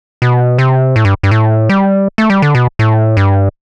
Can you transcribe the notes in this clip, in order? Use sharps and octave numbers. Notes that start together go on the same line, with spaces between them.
B2
C3
A2
G2
G2
A2
G3
A3
G3
D3
B2
A2
G2